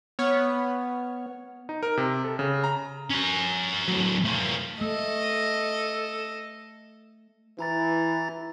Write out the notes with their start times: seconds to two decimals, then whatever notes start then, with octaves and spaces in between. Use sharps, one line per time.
0.19 B3 C#5 F6
1.69 D#4
1.83 A#4
1.97 C3
2.24 A4
2.39 C#3
2.64 A#5
3.10 C#4 A#5
3.88 A2 F#3
4.25 A3 F4
4.81 A3 A4 D#5
7.59 E3 E4 A#5 A6